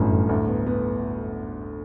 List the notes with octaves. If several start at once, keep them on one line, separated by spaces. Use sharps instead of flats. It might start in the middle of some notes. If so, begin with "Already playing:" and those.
Already playing: G1 F#2 A2 E3
G1
D2
B3
B3